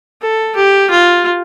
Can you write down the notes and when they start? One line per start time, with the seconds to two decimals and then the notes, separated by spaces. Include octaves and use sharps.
0.22 A4
0.55 G4
0.90 F4